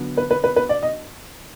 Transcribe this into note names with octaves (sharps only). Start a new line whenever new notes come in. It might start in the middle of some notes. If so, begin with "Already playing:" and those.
Already playing: D3 F#3 B3
B4
B4
B4
B4
D5
D#5